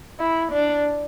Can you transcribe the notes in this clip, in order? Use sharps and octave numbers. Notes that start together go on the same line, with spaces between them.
E4
D4